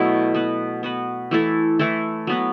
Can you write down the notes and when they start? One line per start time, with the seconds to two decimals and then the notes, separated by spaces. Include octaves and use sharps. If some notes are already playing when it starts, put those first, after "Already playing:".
Already playing: B2 F#3 A3 E4
0.35 B3 F#4 B4
0.83 B3 F#4 B4
1.31 E3 A3 E4 A4
1.79 E3 A3 E4 A4
2.27 F#3 B3 F#4 B4